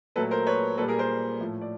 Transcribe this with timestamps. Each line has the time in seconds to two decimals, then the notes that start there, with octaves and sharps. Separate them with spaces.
0.16 A#2 F#3 A3 A4 B4
0.31 A#4 C5
0.47 B4 C#5
0.78 A#2 G3 A4 B4
0.88 G#4 A#4
0.99 A#4 C5
1.40 A2 F3 A3
1.61 D5